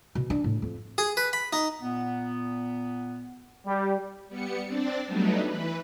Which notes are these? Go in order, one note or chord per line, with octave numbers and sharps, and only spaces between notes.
B2
D4
A2
F2
G#4
B4
B5
D#4
A#2 B3
G3
G3 B3 C#7
C4 D4 D5
F#3 G3 A3 B3 D4 D#4
E3 B4